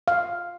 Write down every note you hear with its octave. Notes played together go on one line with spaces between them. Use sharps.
F5